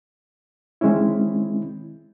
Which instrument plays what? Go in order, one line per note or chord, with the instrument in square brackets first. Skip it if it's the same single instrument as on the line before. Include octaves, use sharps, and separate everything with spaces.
[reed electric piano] D#3 G#3 C4 C#4 E4